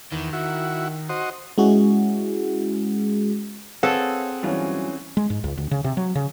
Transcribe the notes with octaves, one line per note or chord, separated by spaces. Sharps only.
E2 D#3
E4 F#4
F#4 C5 D#5
G#3 C#4 E4 F#4 G#4
C4 G#4 A4 B4 C#5 F5 F#5
G2 E3 F#3 C#4 F4
G#3
G#2
C#2
D2
C#3
C3
F#3
C#3